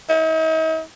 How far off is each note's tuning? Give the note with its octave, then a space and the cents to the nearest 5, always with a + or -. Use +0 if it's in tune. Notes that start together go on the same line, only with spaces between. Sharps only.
D#4 +45